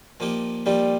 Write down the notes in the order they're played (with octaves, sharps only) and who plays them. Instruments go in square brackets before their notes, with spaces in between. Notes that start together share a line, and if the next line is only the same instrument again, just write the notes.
[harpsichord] A#2 F3 A#3 D#4 G4
[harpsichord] A#2 F3 A#3 D#4 G4 [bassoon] G3